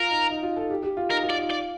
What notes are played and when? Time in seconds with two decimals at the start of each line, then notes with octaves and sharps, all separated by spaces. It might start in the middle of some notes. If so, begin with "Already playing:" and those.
Already playing: F4 A#4
0.11 D#4
0.31 D#4
0.43 F4
0.56 A4
0.70 G4
0.83 G4
0.97 F4
1.10 D#4 A#4
1.23 F4
1.30 D5
1.37 F4
1.51 D5